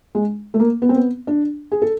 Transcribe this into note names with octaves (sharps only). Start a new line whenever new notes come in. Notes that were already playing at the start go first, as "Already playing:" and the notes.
G#3
A3
A#3
B3
C4
B3
D4
G#4
A4